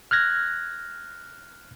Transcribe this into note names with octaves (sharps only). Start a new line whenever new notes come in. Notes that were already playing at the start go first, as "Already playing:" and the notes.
F6 F#6 G#6 A#6